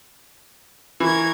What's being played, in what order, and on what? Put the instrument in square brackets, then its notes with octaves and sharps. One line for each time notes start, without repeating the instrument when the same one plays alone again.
[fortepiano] E3 [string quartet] A#4 C#6 G#6